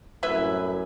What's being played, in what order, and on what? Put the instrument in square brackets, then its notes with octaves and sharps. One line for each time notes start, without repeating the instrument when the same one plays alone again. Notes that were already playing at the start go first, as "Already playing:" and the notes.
[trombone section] C2 F#2 A2 [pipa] E4 B4 E5